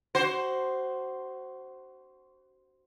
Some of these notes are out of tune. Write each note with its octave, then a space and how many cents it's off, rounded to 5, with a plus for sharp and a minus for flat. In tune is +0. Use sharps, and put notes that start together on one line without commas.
F#4 +25 C5 +0